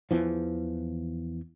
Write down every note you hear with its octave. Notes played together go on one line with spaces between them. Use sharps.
E2 E3 F3